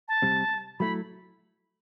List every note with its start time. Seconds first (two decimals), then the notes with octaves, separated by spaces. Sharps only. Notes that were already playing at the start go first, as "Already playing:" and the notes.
0.08 A5
0.22 C3 G3 C4
0.79 F#3 A3 E4 B5